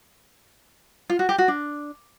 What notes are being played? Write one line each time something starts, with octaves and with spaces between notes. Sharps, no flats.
F4
F#4
G4
F#4
D4